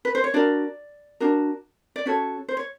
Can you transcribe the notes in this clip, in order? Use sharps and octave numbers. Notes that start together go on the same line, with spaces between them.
B4
C5
C#5
D4 F#4 A#4 D5
D4 F#4 A#4
D5
C#4 F#4 A4 C#5
C5
C#5